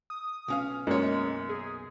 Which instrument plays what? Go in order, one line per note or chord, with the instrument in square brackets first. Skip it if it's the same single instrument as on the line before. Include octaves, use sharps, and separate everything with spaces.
[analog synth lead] D#6
[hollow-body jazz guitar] B1 C#4 F5
[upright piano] F#2 [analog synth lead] G#3 [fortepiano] A#3 C#5
[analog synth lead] G#4